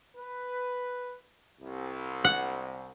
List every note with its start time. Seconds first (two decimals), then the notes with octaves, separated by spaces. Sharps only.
0.16 B4
1.61 C2
2.24 F#5